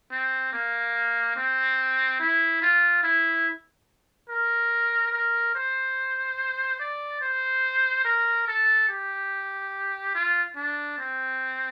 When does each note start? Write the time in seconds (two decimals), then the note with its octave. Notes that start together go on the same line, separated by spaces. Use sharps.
0.12 C4
0.53 A#3
1.36 C4
2.20 E4
2.62 F4
3.03 E4
4.29 A#4
5.12 A#4
5.55 C5
6.80 D5
7.21 C5
8.05 A#4
8.48 A4
8.89 G4
10.15 F4
10.56 D4
10.98 C4